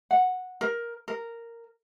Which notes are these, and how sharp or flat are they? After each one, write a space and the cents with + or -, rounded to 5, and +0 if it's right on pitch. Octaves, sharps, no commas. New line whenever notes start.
F#5 -10
A#4 +10
A#4 -10